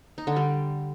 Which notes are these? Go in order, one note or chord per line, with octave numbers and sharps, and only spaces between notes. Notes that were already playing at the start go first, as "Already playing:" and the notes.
D#4
D3
G3